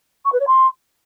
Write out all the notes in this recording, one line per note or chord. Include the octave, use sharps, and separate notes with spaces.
C#6
B4
C#5
C6